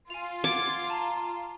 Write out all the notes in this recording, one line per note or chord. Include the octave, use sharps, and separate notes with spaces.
F4 G#5 F7
F#5 D6 G#6 A6
A5 A#5